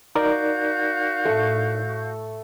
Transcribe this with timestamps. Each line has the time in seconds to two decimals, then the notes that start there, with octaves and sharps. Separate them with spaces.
0.15 D#4 F#4 A#4 D5 F5 G6
1.25 A2 A3 A4 C#6